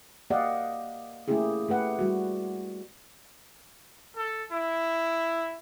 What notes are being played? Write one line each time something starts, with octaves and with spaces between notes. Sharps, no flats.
A#3 G4 D5 D#5 F5 F#5
A3 A#3 C#4 E4 G4 G#4
A3 G4 B4 F#5
G3 F#4
A4
E4